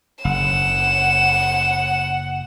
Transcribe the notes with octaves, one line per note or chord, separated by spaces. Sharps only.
F#1 F#5 E7